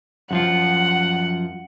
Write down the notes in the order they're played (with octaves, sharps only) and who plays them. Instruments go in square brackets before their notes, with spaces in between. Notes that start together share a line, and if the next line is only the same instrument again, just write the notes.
[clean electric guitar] F#2 F3 F4 [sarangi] F#5